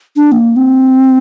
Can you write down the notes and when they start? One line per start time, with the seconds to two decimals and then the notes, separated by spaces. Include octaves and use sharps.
0.16 D4
0.32 A#3
0.56 C4